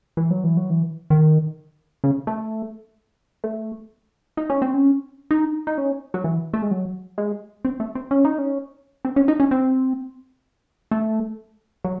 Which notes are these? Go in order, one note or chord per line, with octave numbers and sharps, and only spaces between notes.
E3
F#3
E3
F#3
E3
D#3
C#3
A3
A3
D#4
C#4
C4
C#4
D#4
D#4
C#4
F#3
E3
A3
G#3
F#3
G#3
C4
A3
C4
C#4
D#4
C#4
C4
C#4
D#4
C#4
C4
A3
F#3